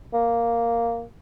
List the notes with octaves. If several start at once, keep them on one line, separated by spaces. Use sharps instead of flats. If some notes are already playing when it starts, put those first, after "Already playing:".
A#3